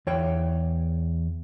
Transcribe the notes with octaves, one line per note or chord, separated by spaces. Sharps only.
E2 C#5 G5